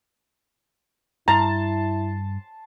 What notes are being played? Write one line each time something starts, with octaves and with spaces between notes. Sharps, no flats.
G2 E4 A5 A#5 C6